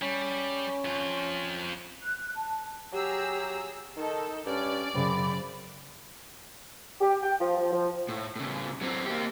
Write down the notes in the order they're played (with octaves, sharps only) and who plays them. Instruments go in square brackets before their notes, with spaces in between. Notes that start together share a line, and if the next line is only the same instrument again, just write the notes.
[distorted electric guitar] G3 [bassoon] C#4
[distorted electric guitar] F2 F4
[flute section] F#6
A5
[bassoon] F#3 [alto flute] G4 [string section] G#4 A#5 E6
[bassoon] D#3 [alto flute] D#4 [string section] A4
[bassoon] G2 [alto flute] C#4 [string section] D5
[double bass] F#2 C#3 [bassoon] C4 [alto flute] B5
[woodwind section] G4
G5
F3
F3
F3
[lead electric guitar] A2
A2 C#3
F#3 C4
A#3 G4